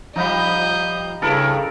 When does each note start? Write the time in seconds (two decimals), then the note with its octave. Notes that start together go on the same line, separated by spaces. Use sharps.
0.16 F3 G3 D#4 D#5 F5 B5 G6
1.22 G2 C#3 E4 A4 A#4